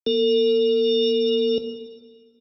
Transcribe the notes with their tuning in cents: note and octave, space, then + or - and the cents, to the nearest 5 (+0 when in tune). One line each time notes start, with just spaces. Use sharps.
A#3 +40 A4 +45